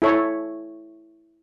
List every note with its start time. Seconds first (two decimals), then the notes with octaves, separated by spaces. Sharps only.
0.02 E4 A4 C#5